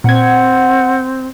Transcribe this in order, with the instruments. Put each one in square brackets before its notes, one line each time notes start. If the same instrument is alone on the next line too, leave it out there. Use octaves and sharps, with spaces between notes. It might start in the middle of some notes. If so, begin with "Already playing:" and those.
[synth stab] A#2 G#6 [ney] C4 [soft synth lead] F#5